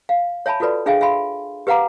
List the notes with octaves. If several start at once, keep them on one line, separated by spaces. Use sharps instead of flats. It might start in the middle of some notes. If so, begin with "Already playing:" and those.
F5
C#5 E5 G#5 A5 B5
F4 F#4 A4 B4 D5
D4 G#4 E5 F5 G5 G#5
E5 F5 G#5 B5 C6
G4 B4 F5 F#5 A#5 D6